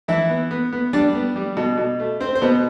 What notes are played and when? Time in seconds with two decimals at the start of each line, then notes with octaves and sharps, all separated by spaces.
0.08 E3 E4 E5
0.29 B3
0.51 B3
0.73 B3
0.93 G3 D4 D5
1.15 B3
1.36 G3
1.57 B2
1.78 B2
1.99 A3
2.20 C4 C5
2.35 C5
2.42 B2 B3 B4